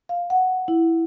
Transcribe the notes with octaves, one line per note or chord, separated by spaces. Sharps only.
F5
F#5
E4